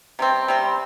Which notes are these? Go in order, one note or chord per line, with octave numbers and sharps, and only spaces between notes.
C3 G3 C4
C3 G3 C4